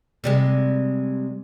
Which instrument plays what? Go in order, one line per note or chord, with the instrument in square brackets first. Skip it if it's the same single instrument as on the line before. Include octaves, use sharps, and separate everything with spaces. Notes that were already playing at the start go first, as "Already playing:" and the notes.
[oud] C3 G3 G#3